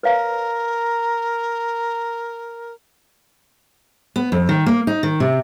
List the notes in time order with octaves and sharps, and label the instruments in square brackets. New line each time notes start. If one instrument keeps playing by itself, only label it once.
[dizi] A#4 [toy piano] B4 C#5 F5
[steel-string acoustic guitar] B3
F2
D#3
A#3
D#4
D#3
C3